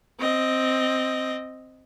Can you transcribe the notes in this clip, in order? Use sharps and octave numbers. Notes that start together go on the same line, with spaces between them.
C4 D#5